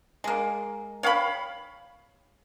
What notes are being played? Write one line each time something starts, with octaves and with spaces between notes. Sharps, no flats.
G#3 A#3
C#5 F5 G5 B5